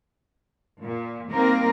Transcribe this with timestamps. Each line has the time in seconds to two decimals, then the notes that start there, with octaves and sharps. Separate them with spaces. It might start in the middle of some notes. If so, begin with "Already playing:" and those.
0.81 A#2
1.31 G3 A#3 C4 D#4 A#4